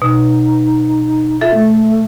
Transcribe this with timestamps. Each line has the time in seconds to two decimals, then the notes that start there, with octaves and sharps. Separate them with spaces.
0.02 B2 D#4
1.41 F4 A4 E5 A6
1.55 A3